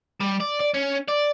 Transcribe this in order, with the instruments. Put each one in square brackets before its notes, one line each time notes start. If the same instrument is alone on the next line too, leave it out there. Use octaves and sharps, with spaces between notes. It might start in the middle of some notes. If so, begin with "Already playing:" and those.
[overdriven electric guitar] G3
D5
D5
C#4
D5